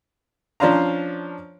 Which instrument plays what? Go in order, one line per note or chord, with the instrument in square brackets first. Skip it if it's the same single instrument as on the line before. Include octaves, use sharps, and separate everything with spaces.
[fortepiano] F3 C#4 D4 C5 F5 A#5